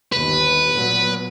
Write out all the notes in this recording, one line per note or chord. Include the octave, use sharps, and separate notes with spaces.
G1 D#2 B4
A#2 F#3 B3